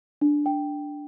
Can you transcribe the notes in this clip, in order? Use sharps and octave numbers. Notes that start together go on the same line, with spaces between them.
D4
G5